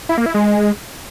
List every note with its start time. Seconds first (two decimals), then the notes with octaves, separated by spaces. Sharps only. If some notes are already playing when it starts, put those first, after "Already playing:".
0.09 E4
0.18 A#3
0.26 E4
0.34 G#3